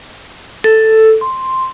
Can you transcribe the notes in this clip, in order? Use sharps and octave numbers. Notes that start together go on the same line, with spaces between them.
A4
C6